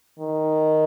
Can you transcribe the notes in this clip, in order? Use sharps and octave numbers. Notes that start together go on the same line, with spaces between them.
D#3